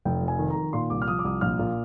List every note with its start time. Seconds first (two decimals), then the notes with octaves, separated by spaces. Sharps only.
0.05 F1 G5
0.22 F2
0.28 G#5
0.39 D#3
0.50 A#5
0.56 D#3
0.73 A#2 C6
0.90 C2 D6
1.02 F6
1.08 F3 D#6
1.19 D6
1.24 C2 D#6
1.41 A#1 F6
1.59 A#2